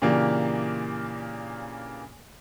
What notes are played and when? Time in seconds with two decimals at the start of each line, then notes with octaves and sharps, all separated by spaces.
0.02 A#2 C#3 E3 A#3 D4 G4